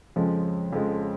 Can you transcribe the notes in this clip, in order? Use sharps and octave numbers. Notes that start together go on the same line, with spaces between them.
F2 C#3 F3 G#3
F2 C#3 F3 G#3